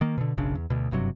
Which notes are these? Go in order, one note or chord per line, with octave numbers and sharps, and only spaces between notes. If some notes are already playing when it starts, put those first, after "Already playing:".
D#3 A#3
B2 D3
F#1 B1 C#3 D4
E2
D2 B2
F#1 G2 C3 F#3